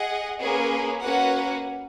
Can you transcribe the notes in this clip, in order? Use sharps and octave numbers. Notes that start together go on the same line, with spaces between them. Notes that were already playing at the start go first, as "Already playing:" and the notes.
Already playing: G#4 D#5 F#5
A#3 C#4 G#4 B4
A#3 C#4 F#4 B4 F#5